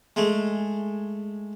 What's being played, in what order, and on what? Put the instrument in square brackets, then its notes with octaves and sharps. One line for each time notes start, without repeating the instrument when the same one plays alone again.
[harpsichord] G#3 A3